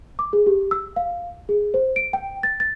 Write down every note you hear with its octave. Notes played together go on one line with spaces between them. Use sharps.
D6
G#4
G4
E6
F5
G#4
C5
D7
G5
A6
A6